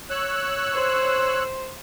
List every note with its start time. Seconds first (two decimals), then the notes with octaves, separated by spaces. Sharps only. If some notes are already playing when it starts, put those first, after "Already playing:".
0.10 C#5 E6 F#6
0.75 C5